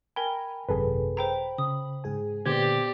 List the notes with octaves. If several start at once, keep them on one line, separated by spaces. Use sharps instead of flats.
A#4 G5 G#5 A#5 B5
G#1 F#2 C3 G#4 A4 B4
C5 G5 A#5 B5
C#3 D#6
G#2 G#4 G#5
A#2 D3 B3 G4 C5 D5 G6 G#6